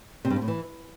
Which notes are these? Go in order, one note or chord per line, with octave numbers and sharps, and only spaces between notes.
C3
G2
C3
A2
E3